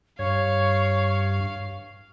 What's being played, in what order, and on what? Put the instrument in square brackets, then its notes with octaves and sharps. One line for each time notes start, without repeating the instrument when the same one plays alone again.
[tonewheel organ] G2 [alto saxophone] C#5 [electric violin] F5 [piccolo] C#6